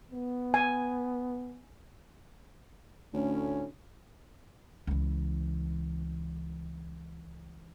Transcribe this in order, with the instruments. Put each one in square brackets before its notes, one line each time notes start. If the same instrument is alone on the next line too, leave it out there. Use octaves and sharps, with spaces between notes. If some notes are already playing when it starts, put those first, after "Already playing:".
[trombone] B3
[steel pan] G#5
[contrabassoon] D2 [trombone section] A2 C#4
[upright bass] C#2 E3